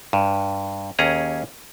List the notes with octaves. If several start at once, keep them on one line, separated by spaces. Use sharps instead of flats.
G2
D#2 C#4 G#4 A#5